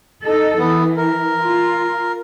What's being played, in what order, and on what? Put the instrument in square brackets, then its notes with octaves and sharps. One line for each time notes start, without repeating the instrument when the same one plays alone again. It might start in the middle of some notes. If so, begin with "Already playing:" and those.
[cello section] D#4 A4
[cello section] E3 [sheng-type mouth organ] B3
[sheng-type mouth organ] A#4
[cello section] F4